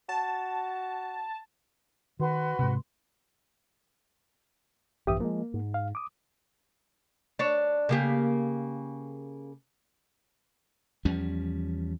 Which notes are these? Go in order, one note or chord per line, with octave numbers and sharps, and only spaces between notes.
F#4 A5
D#3 F#4 B4 C6
G#2 C3
A#1 G2 E3 G4 E5 D#6
F3 G#3 A#3
G#2
F5
D6 D#6
D4 C#5
C#3 A#3 G4
E2 F3 G3 C#4